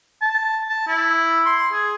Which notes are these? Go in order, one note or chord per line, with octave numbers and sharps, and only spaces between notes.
A5
A5
E4
C6
G#4